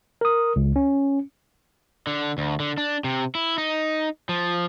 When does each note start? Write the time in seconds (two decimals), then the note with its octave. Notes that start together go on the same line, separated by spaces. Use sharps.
0.21 A#4 D#6
0.56 C#2
0.76 C#4
2.07 D3
2.38 D2
2.60 D3
2.78 D4
3.04 C3
3.35 E4
3.58 D#4
4.29 F3